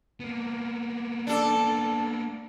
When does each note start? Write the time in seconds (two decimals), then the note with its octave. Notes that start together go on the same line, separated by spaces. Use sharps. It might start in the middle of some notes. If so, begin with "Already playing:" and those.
0.20 A#3 B3
1.27 D4 A4